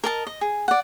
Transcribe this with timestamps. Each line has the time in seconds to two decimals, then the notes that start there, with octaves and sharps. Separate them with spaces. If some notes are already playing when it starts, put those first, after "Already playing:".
0.04 A#4 D#5 A5
0.27 D#5
0.41 G#4
0.68 D5 F#5